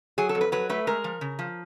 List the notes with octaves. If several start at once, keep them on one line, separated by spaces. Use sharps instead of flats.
F#3 G#4
A4
F2
B4
F#3 B4
A3 B4
G#3 A#4
F3
C#3
F3